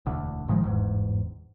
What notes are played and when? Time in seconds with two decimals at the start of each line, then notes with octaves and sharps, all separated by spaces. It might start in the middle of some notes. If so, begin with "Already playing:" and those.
0.06 E1 D2 D3
0.48 A1 D#3 F3 G#3
0.62 G1 E2 G#2